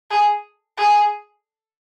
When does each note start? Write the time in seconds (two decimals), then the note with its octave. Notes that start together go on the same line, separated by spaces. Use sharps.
0.10 G#4
0.77 G#4